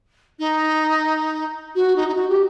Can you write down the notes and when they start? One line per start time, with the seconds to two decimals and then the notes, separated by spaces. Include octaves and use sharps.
0.39 D#4
1.75 F#4
1.96 D#4
2.08 D#4
2.14 F#4
2.29 G4